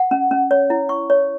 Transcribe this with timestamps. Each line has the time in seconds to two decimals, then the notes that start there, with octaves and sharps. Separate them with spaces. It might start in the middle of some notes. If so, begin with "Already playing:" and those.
Already playing: F#5
0.11 C#4
0.31 C#4
0.51 C#5
0.70 E4
0.89 C#6
1.10 C#5